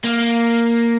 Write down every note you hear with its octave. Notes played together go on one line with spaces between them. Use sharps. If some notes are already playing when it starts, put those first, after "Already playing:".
A#3